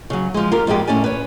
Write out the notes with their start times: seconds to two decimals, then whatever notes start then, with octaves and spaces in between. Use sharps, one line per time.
0.10 C#3 F#3
0.34 F3 G#3
0.51 F4 G4 A#4
0.67 F2 G#2 G#3 G4
0.87 A2 C#4 A4 D5 G#5
1.04 B4 C#5